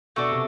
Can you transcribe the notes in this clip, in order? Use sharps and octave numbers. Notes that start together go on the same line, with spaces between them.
B2 A3 D4 F#4 A4
C3